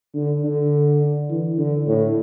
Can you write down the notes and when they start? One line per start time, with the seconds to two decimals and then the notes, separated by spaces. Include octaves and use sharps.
0.14 D3
0.43 D3
1.30 E3
1.58 D3
1.87 A2